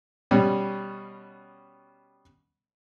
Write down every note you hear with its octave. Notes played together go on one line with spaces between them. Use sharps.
B2 G3 C#4